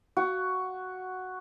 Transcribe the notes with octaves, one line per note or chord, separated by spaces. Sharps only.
F#4